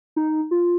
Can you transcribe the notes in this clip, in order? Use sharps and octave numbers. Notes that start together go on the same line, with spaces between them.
D#4
F4